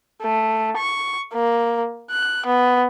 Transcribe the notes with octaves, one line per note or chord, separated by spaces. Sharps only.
A3
C#6
A#3
F#6
B3